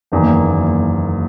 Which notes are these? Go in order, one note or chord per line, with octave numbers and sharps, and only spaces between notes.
F#1 E2 D#3 A#3